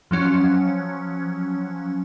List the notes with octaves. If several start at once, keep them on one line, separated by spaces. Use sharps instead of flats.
F3 F#3 C#4